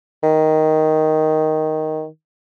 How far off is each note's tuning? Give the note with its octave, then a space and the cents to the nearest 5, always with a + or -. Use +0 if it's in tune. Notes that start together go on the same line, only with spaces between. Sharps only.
D#3 +5